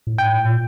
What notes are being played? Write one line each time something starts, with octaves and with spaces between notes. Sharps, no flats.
A2
G#2 G5
A2
A#2